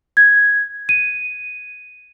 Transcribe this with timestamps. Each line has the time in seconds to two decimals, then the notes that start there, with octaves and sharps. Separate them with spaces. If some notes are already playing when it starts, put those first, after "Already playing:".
0.17 G#6
0.89 D#7